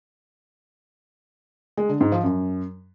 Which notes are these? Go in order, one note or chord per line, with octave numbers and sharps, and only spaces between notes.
G#3
D3
G#2
F3
F#2